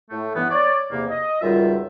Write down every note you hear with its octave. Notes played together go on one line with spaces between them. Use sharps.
A2 A3
G2 E3 B3
C#5 D5
E2 C3 A#3
D#5
C#2 F#2 D#3 G3 F4 E5